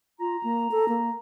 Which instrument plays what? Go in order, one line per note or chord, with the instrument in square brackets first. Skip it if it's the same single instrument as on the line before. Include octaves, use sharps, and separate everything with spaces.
[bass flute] F4 [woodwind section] A#5
[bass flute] A#3
A4
A#3